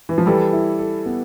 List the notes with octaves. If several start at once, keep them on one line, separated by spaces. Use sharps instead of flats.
E3
F3
E3 G3 A4
E4
A4
B3